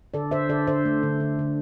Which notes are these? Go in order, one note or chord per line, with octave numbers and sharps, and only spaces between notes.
D3 A4 D5
D3 C5 E5
D3 A4 D5
D3 C5 E5
A3
D3
D3
D3